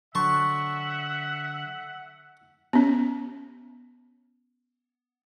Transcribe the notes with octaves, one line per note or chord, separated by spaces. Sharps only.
D3 F#3 E5 F#5 A5 C6 C#6
B3 C#4